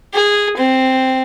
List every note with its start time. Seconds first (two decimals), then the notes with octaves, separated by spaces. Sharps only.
0.14 G#4
0.57 C4